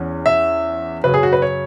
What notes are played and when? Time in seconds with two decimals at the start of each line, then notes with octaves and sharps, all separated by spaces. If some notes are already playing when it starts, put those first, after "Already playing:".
Already playing: E2 E3 C#4
0.26 E5
1.04 F#2 C#3 F#3 C#4 B4
1.14 G#4
1.23 F#4
1.33 B4
1.42 C#5